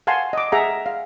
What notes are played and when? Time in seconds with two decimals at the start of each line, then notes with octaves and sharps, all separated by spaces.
0.07 F5 F#5 G#5 A5 C6
0.33 D#5 D6
0.52 G#4 E5 F#5 A#5
0.86 F5